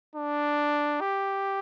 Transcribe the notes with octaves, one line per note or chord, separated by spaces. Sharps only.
D4
G4